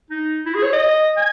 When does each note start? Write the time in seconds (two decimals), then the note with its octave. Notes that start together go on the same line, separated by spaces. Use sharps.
0.10 D#4
0.46 E4
0.55 G#4
0.63 C#5
0.73 D#5
1.17 G#5